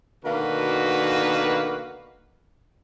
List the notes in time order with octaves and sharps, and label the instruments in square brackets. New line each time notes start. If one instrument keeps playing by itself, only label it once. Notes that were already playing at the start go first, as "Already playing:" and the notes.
[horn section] B2 D3 D#3 A#3 F#4 B4